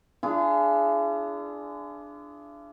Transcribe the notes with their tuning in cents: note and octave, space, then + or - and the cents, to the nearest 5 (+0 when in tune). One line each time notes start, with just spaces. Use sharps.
D4 +0 F4 -45 G#4 +10